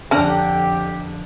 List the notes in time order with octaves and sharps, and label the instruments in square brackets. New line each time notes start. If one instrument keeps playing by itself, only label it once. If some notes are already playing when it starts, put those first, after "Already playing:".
[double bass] F2 [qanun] D3 F#5 A#5 [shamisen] C#4 D4 [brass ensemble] G4